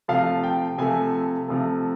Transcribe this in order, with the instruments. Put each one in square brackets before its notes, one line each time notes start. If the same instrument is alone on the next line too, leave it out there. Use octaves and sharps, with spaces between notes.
[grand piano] C3 F3 A3 F5
G5
C3 F3 A3 G#5
C3 F3 A3